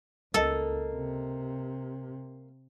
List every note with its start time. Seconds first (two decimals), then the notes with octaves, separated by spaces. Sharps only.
0.34 C#2 A#3 A4 D#5
0.94 C3